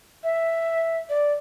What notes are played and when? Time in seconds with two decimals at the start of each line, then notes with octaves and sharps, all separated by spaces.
0.24 E5
1.09 D5